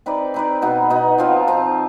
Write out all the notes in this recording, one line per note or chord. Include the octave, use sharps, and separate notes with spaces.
C4 D#4 B4 D5
C4 D#4 B4 D5
B2 B3 D#4
B2 B3 D#4
F3 C4 F4
F3 C4 F4